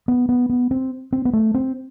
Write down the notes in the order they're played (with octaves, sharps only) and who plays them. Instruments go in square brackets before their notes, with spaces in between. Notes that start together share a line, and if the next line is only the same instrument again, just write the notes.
[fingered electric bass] B3
B3
B3
C4
C4
B3
A3
C4